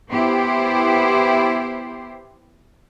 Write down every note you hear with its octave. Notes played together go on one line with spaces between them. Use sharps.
B3 E4 G4 C5